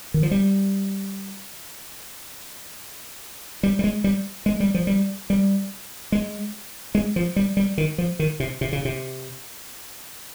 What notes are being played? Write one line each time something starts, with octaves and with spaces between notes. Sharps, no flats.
D#3
F3
G3
G3
G3
G#3
G3
G#3
G3
F3
G3
G3
G#3
G#3
F3
G3
G3
D#3
F3
D#3
C3
C3
C#3
C3